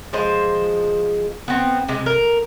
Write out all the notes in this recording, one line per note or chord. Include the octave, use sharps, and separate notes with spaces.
F3 G#3 C5
B3 C4
C3 G#3
A#4